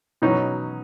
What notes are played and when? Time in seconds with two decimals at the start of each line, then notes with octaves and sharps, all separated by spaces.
0.22 B2 F#3 C#4 D#4